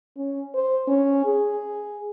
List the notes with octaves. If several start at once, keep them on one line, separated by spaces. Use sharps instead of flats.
C#4
C5
C#4
G#4